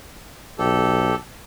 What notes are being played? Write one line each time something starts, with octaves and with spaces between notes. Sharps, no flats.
B1 G4 A4